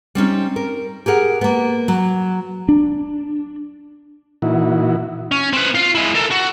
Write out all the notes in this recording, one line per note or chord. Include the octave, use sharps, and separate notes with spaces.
G3 C4 C#4 D#4
A#4
G4 G#4 A#4 F#5
A#3 B3
F#3
D4
A#2 E3 D#4 E4 F#4
C#4
C4 B4
F4 F5
G#3 E4
A4 A#4
F#4